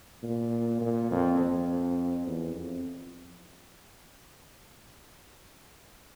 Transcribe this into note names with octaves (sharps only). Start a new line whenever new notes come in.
A#2
A#2
F2
F2
E2
F2